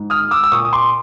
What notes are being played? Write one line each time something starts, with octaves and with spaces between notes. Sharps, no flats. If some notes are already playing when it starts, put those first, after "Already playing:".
Already playing: G#2
D#6 F6
G#3
D6 E6
E6
A#2 C#6 D#6
D#6
C6 D6